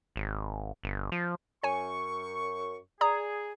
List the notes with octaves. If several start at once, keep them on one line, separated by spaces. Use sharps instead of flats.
G#1
G1
F3
F#2 C#5 G#5 C#6
G#4 D5 A#5 D#6